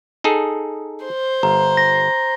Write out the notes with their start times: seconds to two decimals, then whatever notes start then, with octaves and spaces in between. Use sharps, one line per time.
0.24 D#4 G#4 A4
1.06 C5
1.43 G1 A#5
1.77 A#6